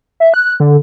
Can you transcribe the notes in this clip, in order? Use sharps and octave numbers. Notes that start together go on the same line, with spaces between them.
E5
F#6
D3